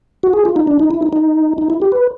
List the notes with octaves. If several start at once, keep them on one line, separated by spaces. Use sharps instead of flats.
F#4
G#4
F4
D#4
D4
D#4
E4
D#4
D#4
D#4
E4
G4
B4